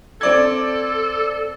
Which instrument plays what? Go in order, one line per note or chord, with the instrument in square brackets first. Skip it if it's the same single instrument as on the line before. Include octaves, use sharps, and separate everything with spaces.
[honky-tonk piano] C4 D5 G#6 [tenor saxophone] A4